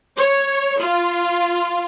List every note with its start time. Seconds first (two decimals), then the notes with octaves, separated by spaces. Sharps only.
0.17 C#5
0.80 F4